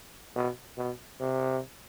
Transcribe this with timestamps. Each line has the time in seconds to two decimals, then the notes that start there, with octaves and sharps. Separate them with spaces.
0.36 B2
0.78 B2
1.21 C3